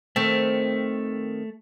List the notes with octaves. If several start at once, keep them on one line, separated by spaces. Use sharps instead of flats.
D#3 A3 C4